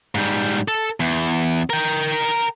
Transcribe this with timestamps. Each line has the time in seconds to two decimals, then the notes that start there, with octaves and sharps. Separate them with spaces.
0.15 G#2 G3
0.68 A4
1.00 E2
1.70 A#4 G5